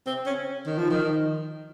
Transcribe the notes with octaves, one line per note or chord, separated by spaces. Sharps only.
C4
C#4
D#3
F3
D#3